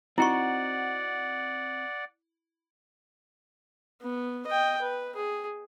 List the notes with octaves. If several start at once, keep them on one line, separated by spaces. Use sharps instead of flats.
C4 D#4 E4 F#4 D5 F#5 C#6
B3
D#5 G5
B4
G#4